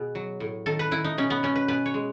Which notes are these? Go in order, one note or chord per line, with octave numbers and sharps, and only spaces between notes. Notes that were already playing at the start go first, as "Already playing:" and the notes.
Already playing: B2 G#4
F#3
A2
D#3 A4
B4
D#3 E4
D#4
B2 C#4
B3
B2 C#4
B4
B2 B4
C#5
G#3